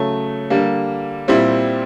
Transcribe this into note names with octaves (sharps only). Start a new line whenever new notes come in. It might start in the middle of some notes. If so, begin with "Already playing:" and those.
Already playing: C#3 F#3 A3
D3 G3 A#3
A#2 G3 C4 E4